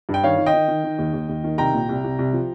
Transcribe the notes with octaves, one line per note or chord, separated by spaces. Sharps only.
G2
G5
D#3 C#5 F5
D#3
D#5 G5
D#3
D#3
D#3
D#2
D#2
D#2
D#3
C2 G5 A#5
A#2
C2
C2
C2
F3